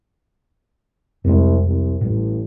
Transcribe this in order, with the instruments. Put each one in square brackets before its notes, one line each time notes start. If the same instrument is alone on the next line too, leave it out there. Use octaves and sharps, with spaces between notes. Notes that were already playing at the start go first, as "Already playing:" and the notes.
[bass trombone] C2 [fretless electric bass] F2 G#3
[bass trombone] C2
[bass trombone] A1 [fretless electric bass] A2 G3